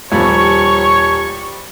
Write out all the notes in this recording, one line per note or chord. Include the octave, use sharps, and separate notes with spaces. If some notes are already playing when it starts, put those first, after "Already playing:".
D#1 F3 G3 C#5 C#6